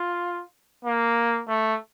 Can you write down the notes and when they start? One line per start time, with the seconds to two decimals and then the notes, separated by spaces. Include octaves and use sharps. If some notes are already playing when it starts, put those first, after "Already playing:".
Already playing: F4
0.85 A#3
1.48 A3